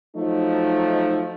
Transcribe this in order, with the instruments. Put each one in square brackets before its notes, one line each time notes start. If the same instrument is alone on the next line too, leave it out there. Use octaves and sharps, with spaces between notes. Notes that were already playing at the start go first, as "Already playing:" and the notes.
[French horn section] F3 F#3 A3 D#4